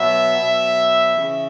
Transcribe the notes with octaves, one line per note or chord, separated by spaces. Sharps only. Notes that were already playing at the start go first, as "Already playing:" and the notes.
Already playing: B2 F#3 E5
B2 F#3
C#3 E3